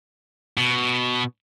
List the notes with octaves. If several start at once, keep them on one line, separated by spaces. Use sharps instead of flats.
B2